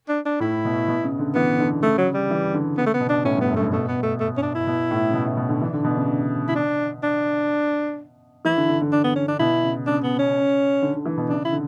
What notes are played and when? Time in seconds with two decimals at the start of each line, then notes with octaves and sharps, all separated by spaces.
0.09 D4
0.25 D4
0.40 A2 E4
0.65 B2
0.88 B2
1.04 C#3
1.19 D3
1.35 E3 B3
1.60 D3
1.83 C#3 A3
1.98 F#3
2.14 G3
2.30 E3
2.54 D3
2.77 C#3 B3
2.86 A3
2.94 B3
3.00 B2
3.09 D4
3.25 A2 C#4
3.36 G2
3.41 B3
3.48 F#2
3.56 G2 A3
3.72 B2 A3
3.88 B3
4.03 A3
4.20 A3
4.37 C#4
4.42 D4
4.55 E4
4.67 B2
4.91 A2
5.10 C#3
5.13 B2
5.26 A2
5.37 B2
5.49 D3
5.62 E3 D4
5.74 D3
5.84 B2
5.97 C#3
6.49 E4
6.56 D4
7.03 D4
8.45 E3 E4
8.57 D3
8.69 D3
8.81 D3
8.92 D4
9.04 B3
9.16 C#4
9.28 D4
9.39 B2 E4
9.63 C#3
9.87 C#3 D4
10.03 B3
10.19 C#4
10.82 D3
10.94 D3
11.06 E3
11.17 B2
11.29 C#3 D4
11.45 E4
11.52 D3